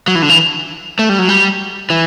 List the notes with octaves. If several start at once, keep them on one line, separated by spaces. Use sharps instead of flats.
F#3
E3
D3
E3
A3
G3
F#3
G3
E3